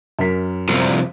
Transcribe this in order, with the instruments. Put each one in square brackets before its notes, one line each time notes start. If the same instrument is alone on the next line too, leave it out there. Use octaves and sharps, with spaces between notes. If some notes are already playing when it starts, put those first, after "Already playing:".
[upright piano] F#2 A#4 B6
[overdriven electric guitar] C2 F3